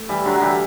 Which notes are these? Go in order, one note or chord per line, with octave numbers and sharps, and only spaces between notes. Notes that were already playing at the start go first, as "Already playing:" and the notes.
Already playing: A3
E3 G3
D3 F#3
F#3
E3 G3